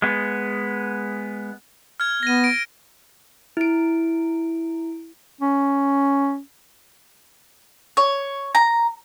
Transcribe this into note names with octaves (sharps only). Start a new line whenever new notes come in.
G#3 B3
F6 G#6
B3 A#6 D#7
D7
E4 D7
C#4
C#5
A#5